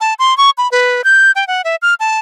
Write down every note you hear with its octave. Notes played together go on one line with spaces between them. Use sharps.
A5
C6
C#6
B5
B4
G6
G5
F#5
E5
F6
A5